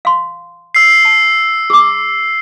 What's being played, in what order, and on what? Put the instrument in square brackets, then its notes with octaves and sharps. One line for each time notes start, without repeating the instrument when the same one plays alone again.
[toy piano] F5 C6
[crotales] E6 C7
[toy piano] A5
G#4 D6